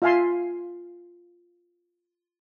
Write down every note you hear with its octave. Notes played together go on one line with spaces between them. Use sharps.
F4 E5 F5 G#5 A5 C6